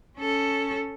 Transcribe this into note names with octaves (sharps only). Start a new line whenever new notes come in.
C#4 A4